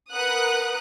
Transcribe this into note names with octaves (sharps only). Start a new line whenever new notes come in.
A#4 B4 F#5 D#6 F#6